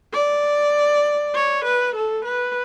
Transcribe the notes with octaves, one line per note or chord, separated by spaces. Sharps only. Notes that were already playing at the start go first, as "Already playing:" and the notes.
D5
C#5
B4
A4
B4